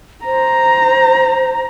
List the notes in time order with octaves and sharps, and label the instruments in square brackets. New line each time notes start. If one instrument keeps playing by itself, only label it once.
[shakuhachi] C5 [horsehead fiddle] A#5